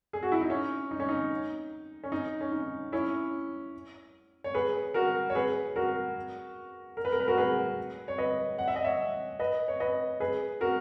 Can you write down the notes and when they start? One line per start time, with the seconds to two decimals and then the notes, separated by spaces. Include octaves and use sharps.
0.13 G#4
0.23 F#4
0.32 E4
0.41 D#4
0.50 C#4
0.91 D#4
1.00 C#4
1.09 D#4
2.04 C#4
2.12 D#4
2.41 C#4
2.52 D#4
2.92 C#4 E4
4.44 C#5
4.54 G#4 B4
4.94 F#4 A#4
5.30 C#5
5.35 G#4 B4
5.76 F#4 A#4
6.97 A#4
7.05 B4
7.12 A#4
7.20 B4
7.28 F#4 A#4
7.37 G#4 B4
8.08 C#5
8.18 B4 D#5
8.59 F#5
8.68 E5
8.76 D#5
8.85 C#5 E5
9.39 B4 D#5
9.68 C#5
9.80 B4 D#5
10.20 G#4 B4
10.61 F#4 A#4